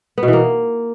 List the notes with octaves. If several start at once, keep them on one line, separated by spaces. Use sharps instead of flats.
B3
B2
E3
A#3